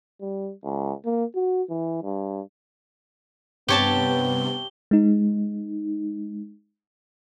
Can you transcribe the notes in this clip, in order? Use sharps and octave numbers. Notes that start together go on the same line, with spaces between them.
G3
C#2
A#3
F#4
E3
G2
G2 C3 B3 G4 C#5 A5 G7
G#3 D#4